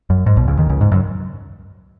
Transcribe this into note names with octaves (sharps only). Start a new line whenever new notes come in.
F#2
G#2
B1 B2
C#2 C#3
D#2 D#3
C#2 C#3
G#2
F#2